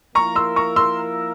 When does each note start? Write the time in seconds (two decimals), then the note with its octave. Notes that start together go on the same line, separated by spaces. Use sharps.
0.15 F3 A#3 E4 A#4 A#5 C#6
0.36 C6 E6
0.56 A#5 C#6
0.76 C6 E6